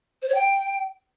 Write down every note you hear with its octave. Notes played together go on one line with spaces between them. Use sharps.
C5
C#5
G5